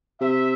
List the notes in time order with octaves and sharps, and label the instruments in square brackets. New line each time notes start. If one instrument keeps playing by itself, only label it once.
[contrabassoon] C3 [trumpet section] E5